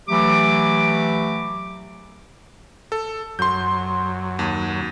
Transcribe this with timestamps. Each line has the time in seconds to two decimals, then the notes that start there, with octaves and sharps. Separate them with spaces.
0.09 E3 F#3 A3 G4 D6
2.92 A4
3.39 F#2 C6 G6
4.39 D#2